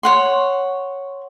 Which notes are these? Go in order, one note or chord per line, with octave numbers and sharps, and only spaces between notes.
C#5 F#5 C6